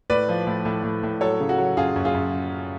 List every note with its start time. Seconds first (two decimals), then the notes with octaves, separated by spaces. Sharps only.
0.10 A2 B4 D5
0.29 F3
0.47 A2
0.65 A2
0.84 A2
1.03 A2
1.21 F#3 A4 C#5
1.40 C#3
1.49 F#4 A4
1.58 F#3
1.77 F#2 F4 G#4
1.96 F#2
2.05 F4 G#4
2.14 F#2